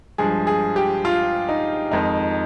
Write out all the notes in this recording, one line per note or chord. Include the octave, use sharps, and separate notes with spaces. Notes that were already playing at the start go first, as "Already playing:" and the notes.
G2 F3 G#3 G#4
G#4
G4
F4
D#4
F2 D#3 G#3 D#4